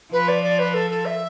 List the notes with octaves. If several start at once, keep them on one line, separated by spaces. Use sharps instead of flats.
F3 B4
D5
D5
B4
A4
A4
E5